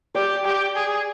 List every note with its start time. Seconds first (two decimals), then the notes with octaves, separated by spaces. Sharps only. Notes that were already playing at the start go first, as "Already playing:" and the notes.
0.15 G4 D5
0.45 G4
0.76 G#4